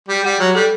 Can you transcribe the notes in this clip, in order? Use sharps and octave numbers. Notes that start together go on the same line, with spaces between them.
G3
G3 F#5
F#3 G4
G3 A4